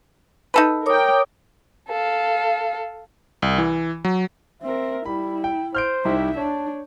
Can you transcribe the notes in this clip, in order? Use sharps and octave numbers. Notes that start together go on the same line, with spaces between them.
D#4 A4 B4
A#4 C#5 G5 D6 D#6
A4 F5
C2
E3
F#3
C4 A#4 E5
G3 E4 B5
G5
C5 F6 G6 D7
C2 D#4 E4 G4 E5
D4 C#5 A5